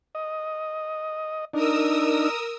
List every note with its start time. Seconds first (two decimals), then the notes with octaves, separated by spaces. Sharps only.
0.15 D#5
1.54 D4 D#4 A#4 D#6 E6